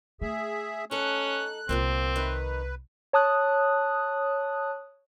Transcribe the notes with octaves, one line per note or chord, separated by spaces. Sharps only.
A3 G#4 E5
C#4 D#4 A4 F#6
C2 A#2 F3 A#3 C4
D#3 D#4 B4
C#5 A5 D#6 F#6